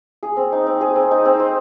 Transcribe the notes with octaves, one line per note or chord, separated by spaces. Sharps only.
G#4
C4
D#4
C4
G#4
C4
D#4
C4
C5